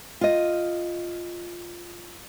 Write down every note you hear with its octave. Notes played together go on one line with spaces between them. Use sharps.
F4 D#5